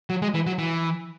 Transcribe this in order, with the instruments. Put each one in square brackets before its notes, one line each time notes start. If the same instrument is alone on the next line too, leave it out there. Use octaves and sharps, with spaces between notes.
[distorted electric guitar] F#3
G#3
E3
F#3
E3